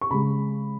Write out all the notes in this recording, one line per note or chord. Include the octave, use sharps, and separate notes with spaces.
C#6
C#3 G#3 B5